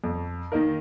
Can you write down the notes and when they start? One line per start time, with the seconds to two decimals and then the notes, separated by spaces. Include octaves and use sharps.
0.04 F2
0.52 D#3 A#3 D#4 A#4